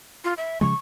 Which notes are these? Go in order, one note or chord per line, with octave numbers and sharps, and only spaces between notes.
F4
E5
C#3 F3 G#3 C#6